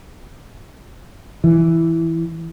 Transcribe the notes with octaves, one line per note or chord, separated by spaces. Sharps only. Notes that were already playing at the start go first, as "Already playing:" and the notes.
E3